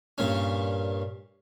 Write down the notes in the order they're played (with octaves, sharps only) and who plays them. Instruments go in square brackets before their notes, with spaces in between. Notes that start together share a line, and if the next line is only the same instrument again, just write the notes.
[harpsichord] G2 A#2 C#4